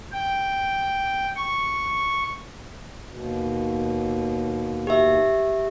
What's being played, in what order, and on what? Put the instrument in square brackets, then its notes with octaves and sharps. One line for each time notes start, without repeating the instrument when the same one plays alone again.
[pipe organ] G5
C#6
[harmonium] D#2 B2
[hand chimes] G4 E5